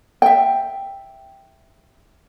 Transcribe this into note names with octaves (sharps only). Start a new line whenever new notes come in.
E5 G5